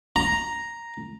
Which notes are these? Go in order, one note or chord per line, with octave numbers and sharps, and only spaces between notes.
A#5